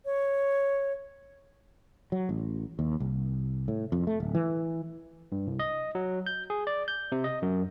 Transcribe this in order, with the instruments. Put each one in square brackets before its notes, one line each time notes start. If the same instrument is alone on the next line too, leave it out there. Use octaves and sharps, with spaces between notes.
[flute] C#5
[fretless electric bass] F#3
A1
D#2
C2
A2
F2
A3
D1
E3
[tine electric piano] G2
C2
D#5
F#3
G6
G#4
D5
G6
C3
D#5
F#2